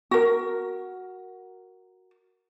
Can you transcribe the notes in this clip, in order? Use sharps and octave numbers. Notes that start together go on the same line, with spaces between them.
F#4 A#4